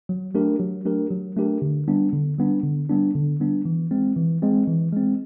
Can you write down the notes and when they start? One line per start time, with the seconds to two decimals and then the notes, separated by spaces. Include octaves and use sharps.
0.09 F#3
0.35 A3 D4 G4 A#4
0.60 F#3
0.85 A3 D4 G4 A#4
1.11 F#3
1.36 A3 D4 G4 A#4
1.62 D3
1.88 G3 B3 D4
2.13 D3
2.38 G3 B3 D4
2.64 D3
2.89 G3 B3 D4
3.15 D3
3.40 G3 B3 D4
3.65 E3
3.91 G#3 C4
4.17 E3
4.42 G#3 C4
4.67 E3
4.93 G#3 C4